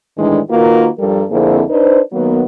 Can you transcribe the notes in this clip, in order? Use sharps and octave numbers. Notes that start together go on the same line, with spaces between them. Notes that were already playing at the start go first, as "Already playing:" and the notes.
A2 D#3 E3 G#3 D4
D#3 A#3 F4 F#4 A#4 B4
G2 F3 G3 A4 A#4
F2 D3 A#3 C4 E4 G#4
D4 D#4 B4 C5
D#3 F#3 A#3 B3